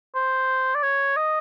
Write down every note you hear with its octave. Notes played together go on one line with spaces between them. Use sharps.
C5
D5
C#5
D#5